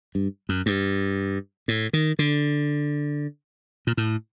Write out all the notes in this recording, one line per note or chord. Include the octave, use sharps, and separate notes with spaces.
G2
F#2
G2
A2
D#3
D3
A#2
A2